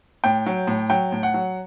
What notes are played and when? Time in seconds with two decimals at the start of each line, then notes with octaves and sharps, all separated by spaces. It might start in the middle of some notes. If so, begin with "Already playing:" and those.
0.24 A2 G5
0.46 F#3
0.67 A2
0.90 F#3 G5
1.12 A2
1.23 F#5
1.34 F#3